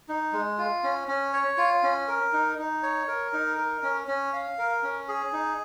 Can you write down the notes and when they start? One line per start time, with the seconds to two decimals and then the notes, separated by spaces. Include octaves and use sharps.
0.08 D#4
0.33 G#3
0.58 F4
0.83 C#4
1.08 C#4
1.33 C#5
1.58 F4
1.83 C#4
2.08 A#4
2.33 D#4
2.58 D#4
2.83 C#5
3.08 A#4
3.33 D#4
3.57 A#4
3.83 C#4
4.07 C#4
4.33 F5
4.58 A#4
4.83 C#4
5.08 G#4
5.33 D#4